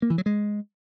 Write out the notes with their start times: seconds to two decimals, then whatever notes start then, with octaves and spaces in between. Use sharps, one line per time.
0.02 A#3
0.10 E3
0.18 F#3
0.26 G#3